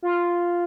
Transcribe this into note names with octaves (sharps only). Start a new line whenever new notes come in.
F4